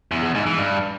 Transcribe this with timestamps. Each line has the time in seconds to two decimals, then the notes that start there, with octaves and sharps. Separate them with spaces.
0.11 E2
0.23 E2
0.35 G#2
0.46 E3
0.58 G2